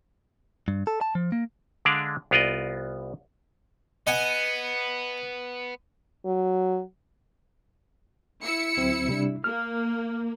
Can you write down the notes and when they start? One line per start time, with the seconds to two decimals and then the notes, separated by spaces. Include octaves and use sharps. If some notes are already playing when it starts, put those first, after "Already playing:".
0.68 G2
0.87 A4
1.01 A5
1.15 F3
1.32 A#3
1.85 D3 G#3 D4 D5 F5
2.31 C2 B3 F4 D5 D#5
4.07 B3 D#5 F#5 G#5
6.25 F#3
8.43 E4 E6 C#7
8.77 D2 F#3 C4
9.08 C3 G3 D4
9.44 A#3 F6